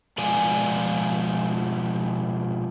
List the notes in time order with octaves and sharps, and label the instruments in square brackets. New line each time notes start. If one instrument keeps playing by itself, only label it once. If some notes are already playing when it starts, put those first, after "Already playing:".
[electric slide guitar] B2 F3 G#3 D5 G#5